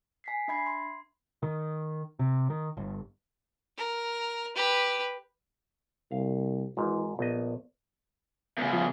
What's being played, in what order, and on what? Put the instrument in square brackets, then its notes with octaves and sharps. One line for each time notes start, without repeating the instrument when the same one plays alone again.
[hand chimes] G#5 B6 C7
D4 E5 B5 G#6 C7
C6
[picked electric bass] D#3
C3
D#3
G1
[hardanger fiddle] A#4
G4 B4
[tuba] C2 [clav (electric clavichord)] F5
[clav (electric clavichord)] G#1 G#2 [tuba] E3
[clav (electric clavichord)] A#1 D#5 [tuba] B3
[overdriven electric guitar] E2 C#3
[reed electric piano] F3